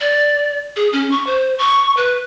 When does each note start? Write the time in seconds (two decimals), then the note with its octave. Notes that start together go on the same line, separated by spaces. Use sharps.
0.01 D5
0.76 G#4
0.93 C#4
1.11 C#6
1.27 C5
1.59 C#6
1.97 B4